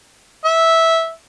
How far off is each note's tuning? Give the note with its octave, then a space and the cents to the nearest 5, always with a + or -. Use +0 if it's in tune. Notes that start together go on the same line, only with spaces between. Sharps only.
E5 -10